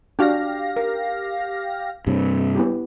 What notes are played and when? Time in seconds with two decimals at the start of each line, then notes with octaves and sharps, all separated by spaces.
0.19 D4 F#4 G4 F5 A#6
0.76 A#4
2.07 G2 C3
2.55 B3 E4 G4